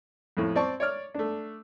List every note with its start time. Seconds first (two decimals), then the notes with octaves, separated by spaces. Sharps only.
0.37 F2 A2
0.55 C4 D5 A5 C#6
0.80 C#5 D5 F6
1.14 A3 D4